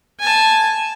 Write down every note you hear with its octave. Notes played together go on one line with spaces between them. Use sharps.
G#5 A5